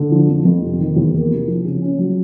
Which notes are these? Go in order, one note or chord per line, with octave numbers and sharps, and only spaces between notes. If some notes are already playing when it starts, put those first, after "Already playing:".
Already playing: D3
F3
F2
F2
C3
D#3
E2
A#3
C3
F3
C#3
C#4
F#3